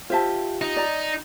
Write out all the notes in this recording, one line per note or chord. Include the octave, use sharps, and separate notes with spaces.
F4 G4 C5 E5 A5
D#4
D5 A#5